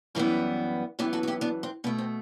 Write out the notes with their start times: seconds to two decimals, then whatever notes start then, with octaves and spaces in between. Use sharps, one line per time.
0.15 F#2 E3 G3 B3 C4 E4
0.99 F#2 E3 B3 E4 G4
1.13 F#4 A4
1.23 F#4
1.28 E4 G4
1.41 B3 D4
1.63 C4
1.84 B2 A3 B3
1.98 C4